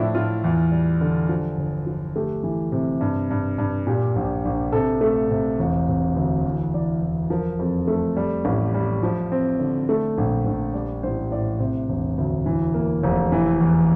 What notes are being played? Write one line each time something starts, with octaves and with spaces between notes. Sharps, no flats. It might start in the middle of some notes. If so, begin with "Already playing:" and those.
Already playing: A2 F3 D4 E4
A2 F4
E2
G3
D3
F3
G1
F3
A3 G4
E3
C3
G2
G2
G2
A#2 G4
A#1
A#1
C3 A4
A3
C3
E1
C3
D2
E2
E3 D5
E2
F3 A#4
F2
A3
G3
A1
G3
F3
C4
D3
A3
A#1
A#1
G3 D5
A1 C5
A2 D5
C3 C5
E1
D2
E3
A#3
F1
E3
E2